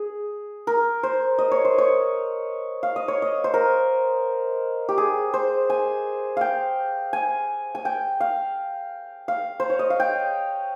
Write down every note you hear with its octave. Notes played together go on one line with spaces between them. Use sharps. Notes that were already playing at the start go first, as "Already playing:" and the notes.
Already playing: G#4
A#4
C5
D#5
C#5
C5
C#5
F5
D#5
C#5
D#5
C5
A#4
G4
G#4
C5
G#5
F5 G5
G#5
G#5
G5
F5
F5
C5
C#5
D#5
F5
G5